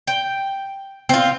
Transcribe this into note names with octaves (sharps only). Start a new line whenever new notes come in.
G5
C4 F4